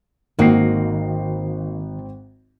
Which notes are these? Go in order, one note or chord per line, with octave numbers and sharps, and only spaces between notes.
G#1 D#3 A#3 D#4 F#4 G5 C7